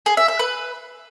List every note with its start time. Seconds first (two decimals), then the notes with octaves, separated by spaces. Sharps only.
0.06 G#4
0.17 E5
0.28 E5
0.39 B4